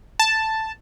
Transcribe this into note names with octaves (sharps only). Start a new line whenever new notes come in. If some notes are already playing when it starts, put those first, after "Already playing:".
A5